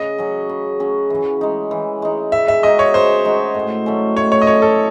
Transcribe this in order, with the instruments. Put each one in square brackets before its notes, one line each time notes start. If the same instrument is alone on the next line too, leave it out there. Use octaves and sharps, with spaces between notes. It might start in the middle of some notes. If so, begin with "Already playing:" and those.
Already playing: [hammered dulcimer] C#3 [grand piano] D#5
[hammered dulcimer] F#3 C#4
C#3
F#3 C#4
E3
G#3 D#4
E3
G#3 D#4
[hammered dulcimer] C#3 [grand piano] E5
[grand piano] E5
[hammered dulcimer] G#3 D#4 F#4 [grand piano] D#5
[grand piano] C#5
[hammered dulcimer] C#3 [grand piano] C5
[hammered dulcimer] G#3 D#4 F#4
A2
F#3 A3 C#4
[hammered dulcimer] A2 [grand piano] C#5
[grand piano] C#5
D#5
[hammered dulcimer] F#3 A3 C#4 [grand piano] C#5
[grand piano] A4